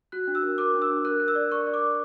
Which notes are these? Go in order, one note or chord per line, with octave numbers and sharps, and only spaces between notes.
F#4 F#6
D4
E6
A#4
A#4 D6
D4
E6
D4
A#4 F#6
A#4
E6
D5
A#4 C#6
D5
D6
D5